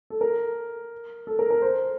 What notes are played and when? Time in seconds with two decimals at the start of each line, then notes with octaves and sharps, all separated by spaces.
0.10 A4
0.21 A#4
1.27 A4
1.39 A#4
1.50 A#4
1.62 C5